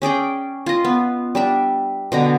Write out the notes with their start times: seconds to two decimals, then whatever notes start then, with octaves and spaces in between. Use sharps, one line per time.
0.02 C#4 G#4 D5 G5
0.66 F4 D#5
0.84 B3
1.35 G3 D4 E5
2.12 B2 D3 A#5